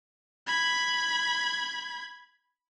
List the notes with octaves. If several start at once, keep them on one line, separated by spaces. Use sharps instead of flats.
B5 G#6